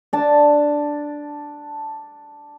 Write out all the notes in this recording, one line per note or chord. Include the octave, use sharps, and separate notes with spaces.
D4 A5